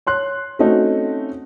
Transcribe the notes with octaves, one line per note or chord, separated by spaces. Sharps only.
C#5 C6 F#6
A3 C4 C#4 D#4 F#4